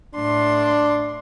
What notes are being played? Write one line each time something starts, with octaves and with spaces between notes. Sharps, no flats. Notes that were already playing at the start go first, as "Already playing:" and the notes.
A2 D4 C6